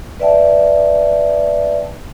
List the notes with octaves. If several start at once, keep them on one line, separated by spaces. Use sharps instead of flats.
B4 D5 E5 G5 A5